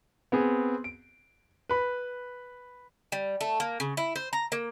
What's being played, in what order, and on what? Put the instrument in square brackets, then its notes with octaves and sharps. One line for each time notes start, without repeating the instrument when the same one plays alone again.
[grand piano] B3 C4 G#4
D7
B4 B5
[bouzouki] G3
A3
A#3
C#3
E4
C5
A#5
A#3